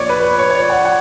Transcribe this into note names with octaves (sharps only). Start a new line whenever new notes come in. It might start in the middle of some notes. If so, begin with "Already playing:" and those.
Already playing: A#1 A#2 A#3 C#5 D5
B4
B4
C#5
C#5
D5
F#5
F#5